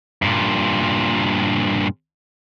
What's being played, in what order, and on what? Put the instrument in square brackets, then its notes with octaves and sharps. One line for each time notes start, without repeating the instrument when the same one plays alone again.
[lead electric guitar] G2 A#2